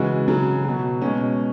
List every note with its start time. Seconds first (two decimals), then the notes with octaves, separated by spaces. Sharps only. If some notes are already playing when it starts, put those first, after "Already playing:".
Already playing: C#3 E3 G#3 F#4
0.28 C#3 F#3
0.64 B2 F#3
1.02 B2 G#3 C#4